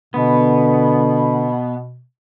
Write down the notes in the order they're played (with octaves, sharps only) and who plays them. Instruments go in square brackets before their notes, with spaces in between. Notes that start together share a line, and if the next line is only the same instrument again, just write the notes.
[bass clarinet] B2 [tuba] D3 [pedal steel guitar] B3